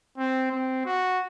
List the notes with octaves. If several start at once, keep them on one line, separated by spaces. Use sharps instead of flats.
C4
C4
F#4